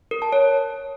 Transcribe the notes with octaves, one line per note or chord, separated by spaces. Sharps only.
A#4
A5
C#5